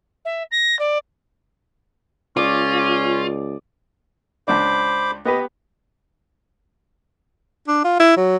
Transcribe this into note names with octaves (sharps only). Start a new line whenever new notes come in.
E5
A#6
D5
C#2 C#4 F4 D5 D#6
C#2 D4 C5 B5 D6
B3 G4 B4 D#5
D4
F4
E4
F#3